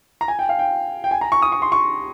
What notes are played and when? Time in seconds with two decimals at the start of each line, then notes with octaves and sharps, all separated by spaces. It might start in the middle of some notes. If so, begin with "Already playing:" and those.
0.21 A#5
0.28 G#5
0.39 G5
0.49 F5
0.59 G5
1.04 G5
1.11 G#5
1.21 A#5
1.32 C#6
1.42 D#6
1.52 C#6
1.62 C6
1.72 C#6